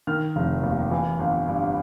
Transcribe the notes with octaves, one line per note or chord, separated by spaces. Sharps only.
D#3 F6
F1
D#2
E3
G1
G2